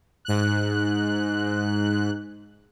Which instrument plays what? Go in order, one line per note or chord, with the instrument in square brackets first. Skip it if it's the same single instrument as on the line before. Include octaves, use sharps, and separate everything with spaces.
[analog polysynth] G#2 F#6